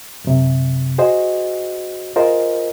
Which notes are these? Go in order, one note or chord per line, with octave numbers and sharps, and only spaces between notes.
F#2 C3
F#4 G#4 C5 D#5
F4 G#4 A#4 C5 D#5